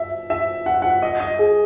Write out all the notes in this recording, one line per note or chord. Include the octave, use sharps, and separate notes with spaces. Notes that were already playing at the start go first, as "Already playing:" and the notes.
Already playing: E5
E5
F#5
F#5
D#5
D#5
G#4